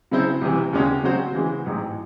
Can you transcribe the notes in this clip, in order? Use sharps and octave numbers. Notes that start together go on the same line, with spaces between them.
C#3 F#3 C4 E4 C5
C2 C3 E3
D#2 C#3 G#3 C#4 F#4
C#3 F#3 C4 F#4 C5
C#3 E3 G#3
A1 G#2 F#3